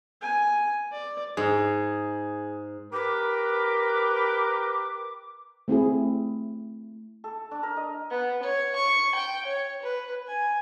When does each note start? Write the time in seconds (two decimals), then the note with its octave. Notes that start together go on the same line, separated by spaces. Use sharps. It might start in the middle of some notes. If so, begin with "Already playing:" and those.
0.22 G#5
0.92 D5
1.37 G#2 G#4
2.93 G4 A#4 B4 D6
5.68 A3 C4 E4 G#4
7.24 A4
7.51 D4
7.63 A#4
7.77 D#5
8.10 B3
8.42 C#5
8.75 C#6
9.15 G5
9.46 C#5
9.82 B4
10.27 G#5